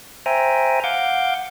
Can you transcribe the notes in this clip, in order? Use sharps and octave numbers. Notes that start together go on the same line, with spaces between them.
C5 E5 G5 G#5 A#5
F5 F#5 D6 G6